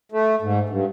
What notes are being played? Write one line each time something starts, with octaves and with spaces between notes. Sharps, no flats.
A3
G#2
G2